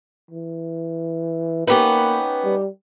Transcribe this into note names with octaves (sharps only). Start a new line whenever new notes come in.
E3
A#3 B3 C#4 D#4 G4 B4
G3